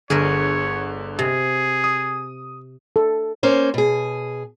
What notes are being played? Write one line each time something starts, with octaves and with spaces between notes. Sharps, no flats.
G1 D3 G#4 A#4 C#5 E5
C3 G#4
D#6
A4
A#3 C#4 C5
B2 G#4